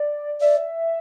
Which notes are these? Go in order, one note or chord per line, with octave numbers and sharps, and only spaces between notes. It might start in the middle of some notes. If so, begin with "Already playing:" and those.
Already playing: D5
D5 E5